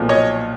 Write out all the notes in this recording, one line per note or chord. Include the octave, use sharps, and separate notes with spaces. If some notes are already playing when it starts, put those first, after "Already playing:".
Already playing: B1 A#2 F3
C#5 D#5